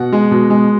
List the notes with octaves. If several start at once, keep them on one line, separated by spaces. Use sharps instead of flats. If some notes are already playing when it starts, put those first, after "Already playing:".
Already playing: B2 F#5
G#3
B2
G#3